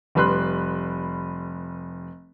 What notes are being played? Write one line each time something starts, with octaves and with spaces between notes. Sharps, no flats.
F1 G3 B4 B5 C6 F#6